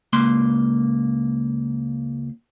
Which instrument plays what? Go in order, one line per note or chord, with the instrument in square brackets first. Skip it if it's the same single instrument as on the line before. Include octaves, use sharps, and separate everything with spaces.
[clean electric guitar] C#2 A#3 C6